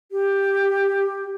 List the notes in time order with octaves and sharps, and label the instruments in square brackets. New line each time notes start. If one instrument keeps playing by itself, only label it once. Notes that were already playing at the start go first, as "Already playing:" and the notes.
[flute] G4